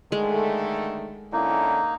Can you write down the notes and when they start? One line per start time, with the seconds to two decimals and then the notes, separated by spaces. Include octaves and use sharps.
0.12 D3 D#3 G#3 A3
1.33 D3 A#3 C#4 D#4 E4